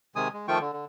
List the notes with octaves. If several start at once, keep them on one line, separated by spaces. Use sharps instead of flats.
C3 D#3 G#3 G#5 D#6
G#3
D#3 F3 A3 F4 G5 C#6
D3
D3